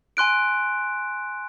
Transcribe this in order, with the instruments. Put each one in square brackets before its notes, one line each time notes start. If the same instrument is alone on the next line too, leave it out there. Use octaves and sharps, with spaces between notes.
[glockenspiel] G#5 C6 F#6 D7